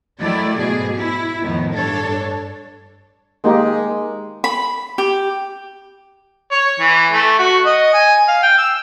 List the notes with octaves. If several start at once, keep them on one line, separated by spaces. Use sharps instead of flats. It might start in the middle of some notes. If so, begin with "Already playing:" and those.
D#3 F#3 A3 E4 D5
G#2 B2 G#4
E4
F2 A2 D#3 B3
G2 D4 A4 C#5
G#3 A#3 D#4 G4
B5
G4
C#5
E3
A3
F#4
D#5
G#5
F5
G5
E6